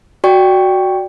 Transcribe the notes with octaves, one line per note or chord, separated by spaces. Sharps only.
F#4 D5 G5 C#6